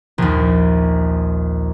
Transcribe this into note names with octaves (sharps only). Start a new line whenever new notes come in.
A#1 D#2